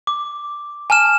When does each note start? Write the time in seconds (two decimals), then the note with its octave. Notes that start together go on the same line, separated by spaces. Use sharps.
0.07 D6
0.90 G#5 A5 F6 E7